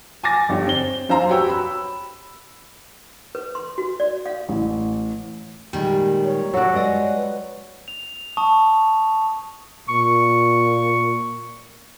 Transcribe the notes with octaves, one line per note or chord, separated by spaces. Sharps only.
G#5 D6 A6 A#6
G1 D3 G4 C#5
C4 G7
F#2 C5 F5 A#5 C6
F#4 G4 B4 C#5 G5 E6
B5 E6
B4
C6
F#4
D5
F5
A1
A#2 D#3 G3 G#3
C#5
F#3 D4 F#4 A4
G#3 B4 D5 D#5
F7
A5 C#6 D#6
A#2 C#6